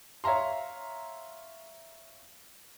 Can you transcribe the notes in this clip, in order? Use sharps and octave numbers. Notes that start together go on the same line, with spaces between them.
C#5 E5 F5 A#5 C6